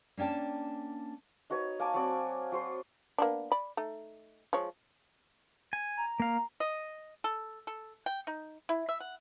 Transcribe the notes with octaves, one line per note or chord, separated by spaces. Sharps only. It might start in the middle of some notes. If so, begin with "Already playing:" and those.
A#3 C#4 D4 G5 A5
D#4 F#4 B4 C#5
A#3 G#5 A5 D6
F#3 C4 D5
F#3 C5 C6
A#3 B3 D4
D5 B5
A3 D#4
F3 G#3 C#5
G#5
A#5
A#3 F5
D#5
A4
A4
G5
D#4
E4
E5
F#5